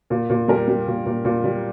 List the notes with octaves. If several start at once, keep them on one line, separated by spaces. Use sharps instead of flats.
A#2
A#2
G3 A#4
G3
A#2
A#2
A#2
G3